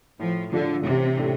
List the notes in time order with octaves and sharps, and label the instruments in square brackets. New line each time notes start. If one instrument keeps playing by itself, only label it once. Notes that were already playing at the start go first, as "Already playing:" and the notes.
[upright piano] A2 [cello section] F3
[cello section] D3 [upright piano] F3 D4 F4 A4
[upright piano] A1 [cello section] C3
[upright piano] A2 A3 D4 G4